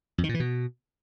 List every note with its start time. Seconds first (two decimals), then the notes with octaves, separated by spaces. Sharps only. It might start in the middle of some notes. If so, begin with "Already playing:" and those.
0.18 F2
0.24 D#3
0.29 A#2
0.34 E3
0.40 B2